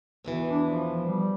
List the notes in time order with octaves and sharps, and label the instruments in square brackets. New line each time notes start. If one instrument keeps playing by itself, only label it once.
[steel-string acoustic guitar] E2 B2 E3
[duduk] D4
F3
G3